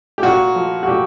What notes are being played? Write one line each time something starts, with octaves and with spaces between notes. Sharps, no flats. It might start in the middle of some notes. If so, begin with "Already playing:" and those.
G4
A#2 F#4
F3
F#4
A#2 G4